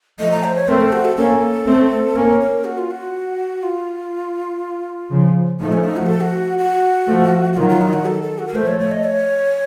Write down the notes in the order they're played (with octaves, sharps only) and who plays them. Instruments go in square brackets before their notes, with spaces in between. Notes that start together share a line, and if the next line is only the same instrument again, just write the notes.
[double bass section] F3 A3 [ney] D#5
[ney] A#5
C5
C#5
[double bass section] A3 C4 [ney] A#4
[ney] A4
F#4
A4
[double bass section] A#3 C#4 [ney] A4
[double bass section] A3 C4
[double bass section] A#3 C#4 [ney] A#4
[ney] A#4
F#4
F4
F#4
F4
[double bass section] C#3 F3
[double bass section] F3 A3 [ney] D#4
[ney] C#4
D#4
F#4
A4
A4
F#4
F#4
[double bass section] F3 A3
[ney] F#4
[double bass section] D#3 F#3 [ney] F4
[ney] F4
D#4
F#4
A4
A4
F#4
A#4
[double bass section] F3 A3 [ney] C5
[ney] C#5
C#5
D#5
C#5